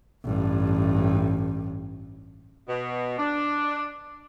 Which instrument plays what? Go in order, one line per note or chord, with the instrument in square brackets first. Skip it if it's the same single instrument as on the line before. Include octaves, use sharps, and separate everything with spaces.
[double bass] A1 G2
[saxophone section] B2
D4